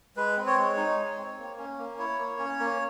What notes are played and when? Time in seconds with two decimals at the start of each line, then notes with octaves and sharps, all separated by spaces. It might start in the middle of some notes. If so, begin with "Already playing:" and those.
0.16 G#3 B4
0.37 C4
0.47 C#5
0.57 G#3
0.77 D#4
0.97 G#3
1.18 C4
1.38 A#3
1.58 C#4
1.78 A#3
1.98 E4 C#5
2.19 A#3
2.39 C#4
2.59 A#3